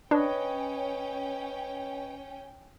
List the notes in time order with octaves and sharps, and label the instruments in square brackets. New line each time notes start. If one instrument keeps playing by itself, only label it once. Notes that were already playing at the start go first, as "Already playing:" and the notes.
[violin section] C#4 G5 [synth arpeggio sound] D4 [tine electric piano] B4 C#5 D#5